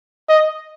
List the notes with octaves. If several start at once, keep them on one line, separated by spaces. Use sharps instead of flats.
D#5